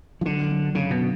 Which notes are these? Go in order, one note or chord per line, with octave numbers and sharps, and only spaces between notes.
F3
D3 F#3
F#3
F#2 C#3
B2
D3